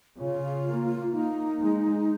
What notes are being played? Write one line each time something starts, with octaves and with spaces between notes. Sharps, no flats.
C#3 F4
A#3
A#3 D#4
G#3